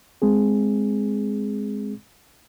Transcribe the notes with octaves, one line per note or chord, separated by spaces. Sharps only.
G#3 C4 G#4